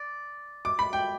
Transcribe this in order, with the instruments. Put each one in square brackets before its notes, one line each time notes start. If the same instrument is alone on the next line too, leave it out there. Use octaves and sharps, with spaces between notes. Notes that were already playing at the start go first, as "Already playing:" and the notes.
Already playing: [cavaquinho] D5
[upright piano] D6
B5
G5